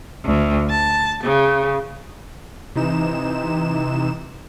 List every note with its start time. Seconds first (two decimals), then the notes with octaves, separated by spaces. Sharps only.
0.25 D2
0.69 A5
1.22 C#3
2.75 C3 E3 D#4 E7